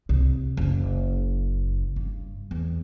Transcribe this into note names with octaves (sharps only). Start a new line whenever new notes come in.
C2
F#1
G2
E2